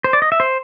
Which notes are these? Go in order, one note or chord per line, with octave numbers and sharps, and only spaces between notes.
C5
D5
D#5
E5
C5